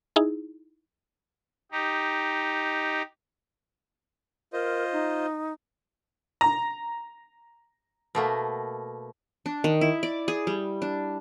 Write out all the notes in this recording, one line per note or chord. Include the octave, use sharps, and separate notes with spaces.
D#4 E4 G#4
D#4 G4
F4 A#4 C5 D#5
D#4
A#5
B2 A3 A#3
D4
D#3
E4
D5
G#4
G3
D4